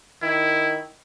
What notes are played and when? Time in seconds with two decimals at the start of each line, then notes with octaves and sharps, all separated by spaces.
0.22 D#3 E4